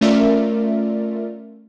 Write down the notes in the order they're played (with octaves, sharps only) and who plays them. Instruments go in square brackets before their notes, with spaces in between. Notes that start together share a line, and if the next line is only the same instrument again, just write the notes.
[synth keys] A3 C#4 F4 A#4 D5 E5